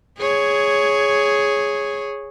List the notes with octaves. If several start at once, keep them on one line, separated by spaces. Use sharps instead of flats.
G#4 C#5